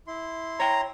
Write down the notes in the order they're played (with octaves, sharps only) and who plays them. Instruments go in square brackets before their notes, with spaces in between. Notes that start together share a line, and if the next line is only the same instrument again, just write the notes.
[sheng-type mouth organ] E4 C6
[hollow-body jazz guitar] C#5 G5 [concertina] A#5